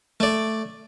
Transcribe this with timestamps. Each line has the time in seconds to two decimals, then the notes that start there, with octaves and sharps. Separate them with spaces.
0.20 A3 D5